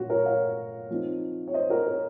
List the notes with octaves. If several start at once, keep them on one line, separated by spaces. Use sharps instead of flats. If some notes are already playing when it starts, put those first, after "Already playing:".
Already playing: A#2 F#3 C#4 F4 F#4
A#4 C#5
C#5 F5
F3 C4 D#4
C#5
C5 D#5
F#4 A#4
A#4 C#5